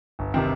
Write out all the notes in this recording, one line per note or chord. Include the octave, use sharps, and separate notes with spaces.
G1
C3 D#3 C4